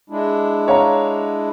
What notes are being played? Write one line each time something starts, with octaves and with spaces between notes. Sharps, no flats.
G#3 D4 E4
C#5 F5 A#5